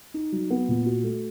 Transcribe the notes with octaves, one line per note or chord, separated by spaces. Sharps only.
D#4
F#3
B3
A#2
F#4
A3